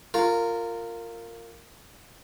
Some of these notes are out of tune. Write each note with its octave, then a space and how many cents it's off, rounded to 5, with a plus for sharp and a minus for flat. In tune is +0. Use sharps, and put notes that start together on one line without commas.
F4 +0 A#4 -20